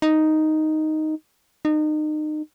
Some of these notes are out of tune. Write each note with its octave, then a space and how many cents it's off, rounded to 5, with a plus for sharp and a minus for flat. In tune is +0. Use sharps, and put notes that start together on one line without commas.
D#4 +0
D#4 -30